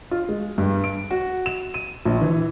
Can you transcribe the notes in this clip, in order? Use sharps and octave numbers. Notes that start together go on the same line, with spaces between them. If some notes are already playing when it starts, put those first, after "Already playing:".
F4
G#3
G2
D7
F#4
E7
D#7
A#1
E3